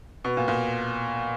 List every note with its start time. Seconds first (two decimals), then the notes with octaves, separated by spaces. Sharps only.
0.25 B2
0.37 A#2
0.48 A#2